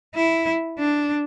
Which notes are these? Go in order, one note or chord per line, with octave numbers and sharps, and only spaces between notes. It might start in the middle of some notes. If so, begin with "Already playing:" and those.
E4
D4